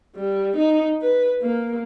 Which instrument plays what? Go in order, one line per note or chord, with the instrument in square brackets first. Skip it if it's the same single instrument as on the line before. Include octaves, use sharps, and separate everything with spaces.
[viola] G3
D#4
B4
A#3